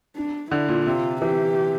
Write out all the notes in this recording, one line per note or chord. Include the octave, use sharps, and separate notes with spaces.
D4
D3 E4
A#2
C3 F4
E3 G4